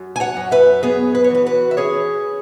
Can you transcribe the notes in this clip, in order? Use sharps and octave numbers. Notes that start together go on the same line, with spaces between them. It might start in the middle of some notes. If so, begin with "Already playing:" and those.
Already playing: F#2
G#5
C#5 F#5
F#2
B4 E5
B3 G#4 C#5
B4
C#5
E3 F#4 B4
F#4 B4
E5
C#4 G#4 C#5